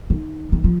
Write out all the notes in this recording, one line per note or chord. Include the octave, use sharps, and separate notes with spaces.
D#3
D#3
F3